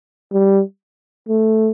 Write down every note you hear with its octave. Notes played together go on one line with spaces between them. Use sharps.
G3
A3